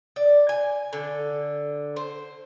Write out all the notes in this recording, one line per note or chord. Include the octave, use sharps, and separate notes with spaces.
D5
G#5
D3
C5